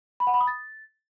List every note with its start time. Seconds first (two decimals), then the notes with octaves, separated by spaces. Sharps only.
0.20 B5
0.27 F#5
0.34 B5
0.41 D#6
0.47 A6